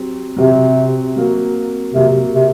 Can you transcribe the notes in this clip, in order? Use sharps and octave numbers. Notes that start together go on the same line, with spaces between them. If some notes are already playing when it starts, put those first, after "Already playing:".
Already playing: F#3 C4 G4
C3 F#3 C4 G4
F#3 A#3 F#4
C3 F#3 A#3 F#4
C3